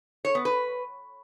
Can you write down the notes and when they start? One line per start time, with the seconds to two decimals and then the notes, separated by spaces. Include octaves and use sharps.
0.25 C#5
0.35 B3
0.45 B4